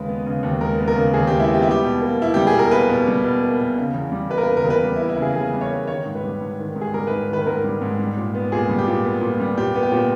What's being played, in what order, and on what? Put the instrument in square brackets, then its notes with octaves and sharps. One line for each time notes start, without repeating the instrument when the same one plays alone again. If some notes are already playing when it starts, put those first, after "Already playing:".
Already playing: [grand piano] D#2 C#3 G#3 B4
B3
C#3
D#2
G#3 A#4
B3
A#4
C#3
D#2 G#4
G4
G#3
E4
B3
G4
E4
G3 G4
B2
A#3
B2 E4
G3 G4
G#4
B2
A#4
A#3 B4
B2
G3
B2
A#3
B2
C#3
E2
G3
A#3 B4
A#4
B4
C#3
A#4
E2
B4
G3
E4
A#3
E4
C#3 G#4
E2 G#4
G3
C#5
A#3
D#3 C#5
G#2
B4
G3
G#2
D#3
G#2
G#4
G3 A#4
B4
G#2
D#3 B4
B4
G#2 A#4
G3
G#2
G3
A#2
B3
A#2 G#4
G3
G4
A#2
B3
A#2
G3
A#2 G4
B3
G4
A#2